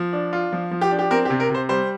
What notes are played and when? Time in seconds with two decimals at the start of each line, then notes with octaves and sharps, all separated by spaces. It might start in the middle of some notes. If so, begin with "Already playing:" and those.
Already playing: F3
0.13 D4
0.33 F4
0.52 F3
0.71 F3
0.81 G4
0.91 D4
0.99 G4
1.11 C4 A#4
1.25 G4
1.30 C3
1.40 A#4
1.50 C3 C5
1.69 G3 C5